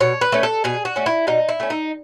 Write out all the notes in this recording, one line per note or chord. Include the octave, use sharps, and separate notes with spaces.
B2 C#5
B4
A3 C#4
A4
B2 G#4
F#4
A3 C#4
E4
B2 D#4
E4
A3 C#4
D#4